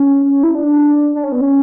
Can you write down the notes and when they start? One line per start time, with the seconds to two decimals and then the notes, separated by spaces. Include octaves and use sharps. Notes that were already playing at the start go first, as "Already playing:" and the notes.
Already playing: C#4
0.43 E4
0.55 D4
1.15 D4
1.24 C#4
1.32 B3
1.41 C#4